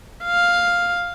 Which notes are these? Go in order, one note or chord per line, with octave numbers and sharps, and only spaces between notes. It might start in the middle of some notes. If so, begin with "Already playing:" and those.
F5